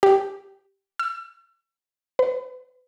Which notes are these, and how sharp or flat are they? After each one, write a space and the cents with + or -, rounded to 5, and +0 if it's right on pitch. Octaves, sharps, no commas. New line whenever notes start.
G4 -5
E6 +35
B4 +35